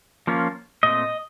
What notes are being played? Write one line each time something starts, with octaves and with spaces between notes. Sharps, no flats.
F3 A#3 C#4 F4
A#2 A3 C4 D#5